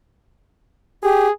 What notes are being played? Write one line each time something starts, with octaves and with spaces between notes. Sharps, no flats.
G4 G#4